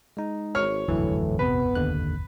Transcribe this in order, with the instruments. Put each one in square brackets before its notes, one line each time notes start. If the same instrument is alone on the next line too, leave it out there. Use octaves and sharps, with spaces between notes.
[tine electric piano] G#3 D#4
[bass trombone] G#1 [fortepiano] C#5 F6
[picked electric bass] D#1 G#1 F2 [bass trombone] A2 [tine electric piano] D3 E3 F#3
[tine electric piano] C3 [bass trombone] B3 [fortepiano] B4
[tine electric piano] D#2 D3 F#6